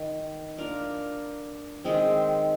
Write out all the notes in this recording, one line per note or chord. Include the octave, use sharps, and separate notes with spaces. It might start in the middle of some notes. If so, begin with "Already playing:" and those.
Already playing: D#3
A#3 D4 F4 A#4
D#3 G#3 C4